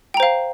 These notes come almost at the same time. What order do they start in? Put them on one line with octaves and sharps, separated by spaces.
G5 A#5 C5 F5